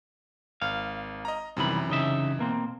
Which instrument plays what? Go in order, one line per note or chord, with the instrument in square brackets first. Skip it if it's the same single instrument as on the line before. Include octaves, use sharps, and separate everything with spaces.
[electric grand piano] G#1 [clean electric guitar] F5
[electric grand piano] D#5 A#5
[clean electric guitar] C2 D#3 B5 [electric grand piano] F#2 C3 E3
[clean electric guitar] C#3 D#4 E5
B2 A#3 C4